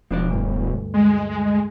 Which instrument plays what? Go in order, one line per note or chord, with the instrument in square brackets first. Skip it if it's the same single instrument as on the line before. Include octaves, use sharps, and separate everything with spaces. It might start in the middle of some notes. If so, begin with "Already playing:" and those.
[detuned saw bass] E1 [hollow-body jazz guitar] F3 D4 D5
[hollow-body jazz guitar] D2 G2
[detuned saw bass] G#3